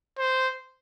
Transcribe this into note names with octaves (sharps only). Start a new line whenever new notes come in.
C5